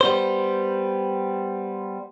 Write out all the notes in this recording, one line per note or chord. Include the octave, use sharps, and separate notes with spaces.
G3 B3 C5